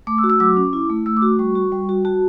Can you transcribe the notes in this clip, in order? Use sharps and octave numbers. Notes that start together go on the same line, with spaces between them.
A3 D6
E6
F#4
E6
F#3 D6
C#4
E4
A3
A3 E6
D6
F#4
G3 C#6
F#4
G3
F#4
F#4 A5